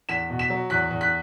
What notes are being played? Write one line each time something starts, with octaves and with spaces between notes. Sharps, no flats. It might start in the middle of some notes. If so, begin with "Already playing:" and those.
E2 B6 E7
B2
B6 E7
F#3
E2 F#6 B6
E2
F#6 B6